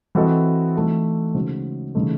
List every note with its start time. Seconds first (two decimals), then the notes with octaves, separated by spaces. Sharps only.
0.15 E3 C4 F#4 A4 D#5
0.75 E3 A3 D#4
1.34 C#3 G#3 D#4 F#4 C5
1.95 C#3 E3 A3 D#4